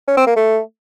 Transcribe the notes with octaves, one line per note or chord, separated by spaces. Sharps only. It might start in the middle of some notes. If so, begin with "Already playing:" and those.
C#4
C4
A#3
A3